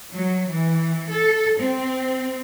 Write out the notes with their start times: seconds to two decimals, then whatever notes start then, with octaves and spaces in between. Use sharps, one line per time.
0.14 F#3
0.49 E3
1.11 A4
1.59 C4